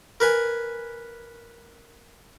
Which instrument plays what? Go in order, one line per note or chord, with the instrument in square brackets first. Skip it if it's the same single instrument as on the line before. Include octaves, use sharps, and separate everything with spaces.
[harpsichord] A#4 B4 G#5